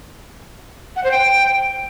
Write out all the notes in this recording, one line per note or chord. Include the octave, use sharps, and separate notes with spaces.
F#5
C5
G5